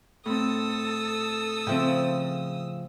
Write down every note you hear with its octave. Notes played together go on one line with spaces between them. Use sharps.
A2 C4 A4 D#6 E6
C#3 F3 C4 E5 G5